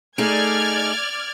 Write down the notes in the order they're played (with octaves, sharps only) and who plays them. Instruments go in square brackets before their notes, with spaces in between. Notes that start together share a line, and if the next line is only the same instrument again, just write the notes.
[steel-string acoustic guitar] A3 D#4 G#4 [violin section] D5 F6 G#6